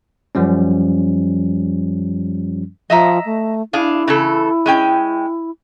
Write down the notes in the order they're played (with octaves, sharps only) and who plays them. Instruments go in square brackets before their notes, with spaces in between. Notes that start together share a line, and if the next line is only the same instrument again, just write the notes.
[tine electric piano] F#2 F3 G3 C#4
[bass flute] F3 [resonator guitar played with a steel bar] D#5 E5 A#5
[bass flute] A3
[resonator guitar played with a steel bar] D4 G#4 F5 [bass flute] E4
[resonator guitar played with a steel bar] C#3 E3 A4
G#3 C#4 G5